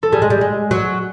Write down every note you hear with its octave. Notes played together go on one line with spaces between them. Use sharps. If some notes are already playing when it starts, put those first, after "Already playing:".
A4
G3 G#4
G#3
G3
G#3
F#3